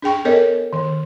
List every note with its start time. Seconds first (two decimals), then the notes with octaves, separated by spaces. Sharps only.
0.02 D4 G#4 G5 C#6
0.25 B3 A4 A#4 C#5 D#5
0.73 D#3